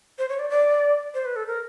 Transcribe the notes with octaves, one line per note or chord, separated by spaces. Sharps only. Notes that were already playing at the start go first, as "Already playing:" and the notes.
C5
C#5
D5
D5
C5
B4
A4
A#4